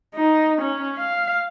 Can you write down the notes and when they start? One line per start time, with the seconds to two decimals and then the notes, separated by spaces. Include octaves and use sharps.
0.15 D#4
0.62 C#4
0.97 F5